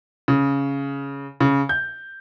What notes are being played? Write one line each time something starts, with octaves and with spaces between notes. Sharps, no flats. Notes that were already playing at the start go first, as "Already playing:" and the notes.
C#3
C#3
G6